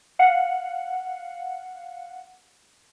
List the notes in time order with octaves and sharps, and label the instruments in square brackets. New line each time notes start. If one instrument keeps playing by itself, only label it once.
[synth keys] F5 F#5